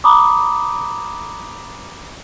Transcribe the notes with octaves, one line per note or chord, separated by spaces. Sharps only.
A#5 B5 D6 D#6